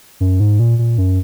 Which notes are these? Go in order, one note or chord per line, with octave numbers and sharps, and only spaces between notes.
F#2
G#2
A#2
A#2
F#2